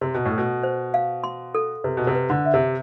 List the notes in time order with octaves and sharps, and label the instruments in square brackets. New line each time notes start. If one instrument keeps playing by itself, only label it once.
[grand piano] C3 [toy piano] C6
[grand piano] B2
A2
[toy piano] A4
[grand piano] B2
[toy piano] C5
F5
C6
A4
[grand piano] C3 [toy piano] B4
[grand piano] B2
C3
[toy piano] B4
[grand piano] D3
[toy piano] E5
[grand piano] C3